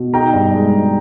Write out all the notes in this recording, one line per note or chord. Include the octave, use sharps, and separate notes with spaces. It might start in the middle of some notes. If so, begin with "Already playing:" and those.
Already playing: B2
D#4 G5 A#5
G2
G#3
G#3